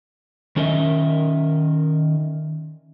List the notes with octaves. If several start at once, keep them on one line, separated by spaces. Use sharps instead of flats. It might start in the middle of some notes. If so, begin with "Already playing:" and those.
D#3 C#4 A#4 D#5 E5